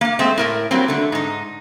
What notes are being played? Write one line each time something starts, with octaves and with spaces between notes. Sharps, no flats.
A#3 F5
G#3 A3 C4 C5 E5
A2 A#4 E5
F#3 G3 A#3 C4
D3 A3
G#2 D#4